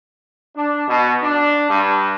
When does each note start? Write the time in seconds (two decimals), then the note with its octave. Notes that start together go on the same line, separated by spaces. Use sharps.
0.56 D4
0.88 B2
1.23 D4
1.69 G2